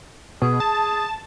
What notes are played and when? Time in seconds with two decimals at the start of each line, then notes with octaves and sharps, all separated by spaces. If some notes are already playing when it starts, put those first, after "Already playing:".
0.42 B2 G#4
0.60 A5